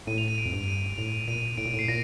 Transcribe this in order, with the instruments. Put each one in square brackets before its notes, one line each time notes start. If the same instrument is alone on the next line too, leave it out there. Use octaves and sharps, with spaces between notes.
[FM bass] A2 [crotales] D#7
[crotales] F7
D#7
D7
[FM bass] F2
G2
[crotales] D#7
[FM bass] A2 [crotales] F7
[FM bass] A#2 [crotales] D#7
[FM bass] A2 [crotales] D7
[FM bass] A#2
[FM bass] A2 [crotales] C7
[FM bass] A#2 [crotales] A#6